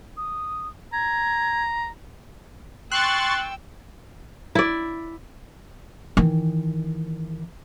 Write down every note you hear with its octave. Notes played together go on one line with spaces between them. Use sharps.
D#6
A#5 G#6
G5 C6 C#6 E6 F#6 A6
E4 D5
D#3 E3